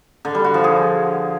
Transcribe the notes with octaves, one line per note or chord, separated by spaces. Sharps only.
D3
G3
F#4
F3
G#4